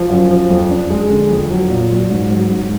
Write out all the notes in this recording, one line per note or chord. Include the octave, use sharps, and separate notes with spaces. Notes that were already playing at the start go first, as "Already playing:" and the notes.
Already playing: F3
F#2
F3
F2
D4
G#3
D3
F2
F#3
A#2
F#3
G#2
F#3
G#2